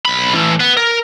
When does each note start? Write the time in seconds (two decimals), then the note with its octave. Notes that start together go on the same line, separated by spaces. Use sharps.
0.05 B1 B5
0.34 E3 A3
0.60 B3
0.77 A#4